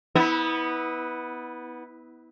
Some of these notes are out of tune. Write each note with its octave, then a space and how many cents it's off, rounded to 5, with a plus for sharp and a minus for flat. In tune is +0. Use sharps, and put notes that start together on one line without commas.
B3 +0 E4 -30